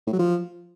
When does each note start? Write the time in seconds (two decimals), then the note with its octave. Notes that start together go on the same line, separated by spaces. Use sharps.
0.07 A2
0.13 F#3
0.19 F3